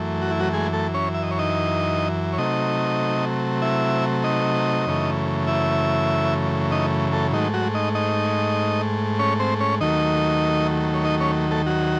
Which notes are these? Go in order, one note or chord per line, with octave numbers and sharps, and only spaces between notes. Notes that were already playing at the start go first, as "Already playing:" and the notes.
Already playing: F#2 E3 A3
F#4
E4
F#3 F#4
G#3 G#4
A3 A4
C#4 C#5
E5
D#5
C#5
D#4 D#5
C#5
C3 F#3 A3 D#4 D#5
E4 E5
D#4 D#5
F#2 C#3 E3 A3
E4 E5
D#4 D#5
A3 A4
G#2 D#3 F#3 A3 D#4
F#3 F#4
D#4 D#5
D#4 D#5
C#4 C#5
C4 C5
C#4 C#5
D#2 D#3 F#3 A3 D#4 D#5
C#5
D#4 D#5
C#4 C#5
A3 A4
F#3 F#4